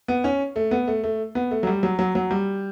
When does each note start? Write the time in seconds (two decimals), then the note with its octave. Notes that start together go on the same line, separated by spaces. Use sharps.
0.08 B3
0.24 C#4
0.56 A3
0.71 B3
0.88 A3
1.04 A3
1.35 B3
1.51 A3
1.63 F#3
1.67 G3
1.83 F#3
1.99 F#3
2.15 F#3
2.31 G3